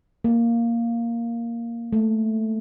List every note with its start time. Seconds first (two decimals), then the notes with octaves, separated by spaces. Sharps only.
0.24 A#3
1.93 A3